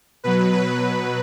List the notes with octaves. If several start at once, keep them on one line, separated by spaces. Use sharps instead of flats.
B2 F#3 B4
B4